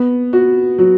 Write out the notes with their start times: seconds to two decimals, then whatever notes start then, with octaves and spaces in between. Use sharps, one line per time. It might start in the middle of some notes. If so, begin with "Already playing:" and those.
Already playing: B3
0.33 F#4
0.78 F#3